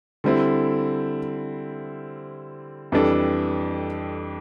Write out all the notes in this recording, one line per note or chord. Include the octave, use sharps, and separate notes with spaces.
D3 G3 C4 E4
F2 E3 G3 D4 A4